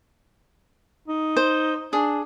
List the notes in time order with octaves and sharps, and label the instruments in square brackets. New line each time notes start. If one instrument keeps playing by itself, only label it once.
[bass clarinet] D#4
[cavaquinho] C5
[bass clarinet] D4 [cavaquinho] G#4